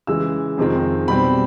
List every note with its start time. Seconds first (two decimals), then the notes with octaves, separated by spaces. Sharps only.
0.07 C#3 E3 G#3 E6
0.58 F2 C3 D#3 G#3 C4
1.08 B2 G3 C4 B5